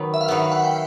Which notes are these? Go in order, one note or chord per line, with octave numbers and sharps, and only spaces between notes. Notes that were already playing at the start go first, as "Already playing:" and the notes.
Already playing: D#3 F#3 B3
E5
F5
D#3 F#3 B3 F#5
F#5
G5